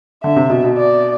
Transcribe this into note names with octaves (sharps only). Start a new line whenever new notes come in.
D3 E5
C3
B2
B2
D5